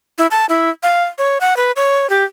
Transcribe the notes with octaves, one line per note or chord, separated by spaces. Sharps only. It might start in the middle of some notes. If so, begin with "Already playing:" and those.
E4
A5
E4
F5
C#5
F#5
B4
C#5
G4